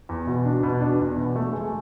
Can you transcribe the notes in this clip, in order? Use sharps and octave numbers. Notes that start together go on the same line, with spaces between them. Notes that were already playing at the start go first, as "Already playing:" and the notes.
E2
B2
D4
B2
D4
E2
B2
A3
G#3